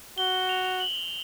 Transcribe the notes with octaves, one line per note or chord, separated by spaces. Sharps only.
F#4 G7
F7
F7
F#7